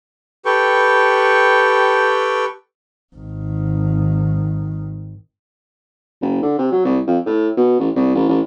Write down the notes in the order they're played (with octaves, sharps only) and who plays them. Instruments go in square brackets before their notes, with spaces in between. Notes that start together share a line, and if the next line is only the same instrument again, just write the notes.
[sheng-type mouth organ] G4 A4 B4 G5 C#6
[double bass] G#1 D#3
[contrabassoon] F#1
D3
C3
F#3
C2
F2
A2
B2
A1
C2
A1
A1